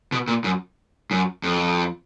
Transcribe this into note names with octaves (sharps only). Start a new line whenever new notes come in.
B2
A#2
F#2
F#2
F2